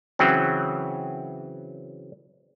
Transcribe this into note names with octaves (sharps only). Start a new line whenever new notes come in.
C#3 E3 F#3 C4